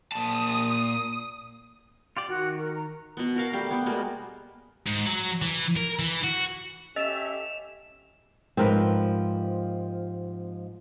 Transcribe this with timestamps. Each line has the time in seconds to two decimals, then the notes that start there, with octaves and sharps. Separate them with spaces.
0.12 A#2 A5 D#6
2.17 F4 G4 D5
2.29 D#3 F#4
2.59 A#4
2.75 A#5
3.17 B2 B3
3.36 F#4 A#4 F5
3.53 G3 A3 G4 F5
3.70 A3 B3
3.86 B2 G3 G#3 A#3
4.86 G#2
5.06 F#3
5.42 E3
5.77 A#4
5.99 E3
6.24 F#4
6.96 C#4 G4 A4 D#5 E5 E7 F7
8.57 G#2 F3 G3 C4 A#4 B4